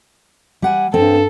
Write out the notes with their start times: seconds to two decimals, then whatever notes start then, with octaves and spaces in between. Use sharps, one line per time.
0.62 G3 F#5 G#5
0.94 G2 C4 A4